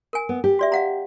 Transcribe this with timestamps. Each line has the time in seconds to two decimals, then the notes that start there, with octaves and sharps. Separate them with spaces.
0.13 A#4 G#5
0.29 B3
0.44 G4
0.59 F#4 D5 E5
0.72 F5 F#5 A#5